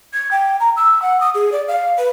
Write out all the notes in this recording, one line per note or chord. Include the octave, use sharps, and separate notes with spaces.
G#6
G5
A#5
E6
F#5
D#6
G#4
D5
F5
B4